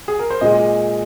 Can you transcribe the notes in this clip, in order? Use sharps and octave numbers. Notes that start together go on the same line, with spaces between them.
G#4
A#4
C5
A#2 G#3 D#5